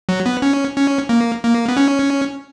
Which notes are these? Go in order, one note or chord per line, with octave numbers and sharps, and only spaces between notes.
F#3
B3
C#4
C#4
A#3
A#3
B3
C#4